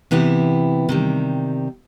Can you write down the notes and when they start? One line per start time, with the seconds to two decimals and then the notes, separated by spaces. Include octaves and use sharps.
0.11 C3 E3 B3 E4 G4
0.89 C3 D#3 G3